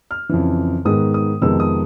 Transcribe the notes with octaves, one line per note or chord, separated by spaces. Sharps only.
F6
F2 C#3 E3
G#2 D#3 G#3 B3 D#6
D#6
F2 C3 D#3 G#3 B3 E6
D#6